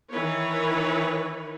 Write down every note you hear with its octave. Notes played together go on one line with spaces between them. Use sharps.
D#3 E3 B4 C#5